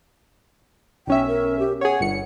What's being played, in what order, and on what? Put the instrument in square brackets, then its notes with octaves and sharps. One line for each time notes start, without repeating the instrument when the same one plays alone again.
[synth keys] B1 C#4 E5 [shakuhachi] G5
[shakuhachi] A#4
G4
[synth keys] G#4 C#5 [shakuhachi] F#5
[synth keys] G1 C#7